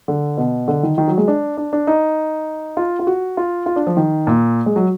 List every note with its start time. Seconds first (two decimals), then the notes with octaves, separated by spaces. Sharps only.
0.08 D3
0.37 B2
0.68 D3
0.83 D#3
0.98 D#3
1.08 F#3
1.18 G#3
1.28 D4
1.57 D4
1.73 D4
1.87 D#4
2.77 F4
2.99 F4
3.07 F#4
3.37 F4
3.66 F4
3.76 D4
3.87 F3
3.97 D#3
4.27 A#2
4.66 G#3
4.76 F#3